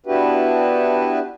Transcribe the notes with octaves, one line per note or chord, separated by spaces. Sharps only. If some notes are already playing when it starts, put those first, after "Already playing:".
B3 D4 E4 F#4 G4 B4